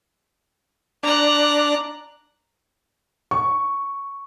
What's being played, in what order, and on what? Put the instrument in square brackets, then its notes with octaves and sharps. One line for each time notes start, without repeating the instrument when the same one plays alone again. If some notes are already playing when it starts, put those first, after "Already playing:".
[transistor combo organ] D4 [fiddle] A#5 F#6
[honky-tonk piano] C#6